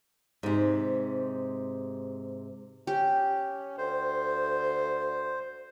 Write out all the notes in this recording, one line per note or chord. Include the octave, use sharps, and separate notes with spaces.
G#2 C3
C#4 G4
D2 C5